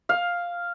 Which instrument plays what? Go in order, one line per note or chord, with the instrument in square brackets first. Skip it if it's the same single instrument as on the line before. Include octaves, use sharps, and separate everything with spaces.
[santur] F5